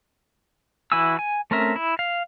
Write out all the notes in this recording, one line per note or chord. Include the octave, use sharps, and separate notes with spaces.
E3 E4 F#4 G#5 E6
G#5
A3 C4 C#4 A#4 E5
E4
F5